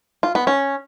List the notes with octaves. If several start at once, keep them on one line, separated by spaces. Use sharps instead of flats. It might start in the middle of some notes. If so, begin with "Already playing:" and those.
F4
B3
C#4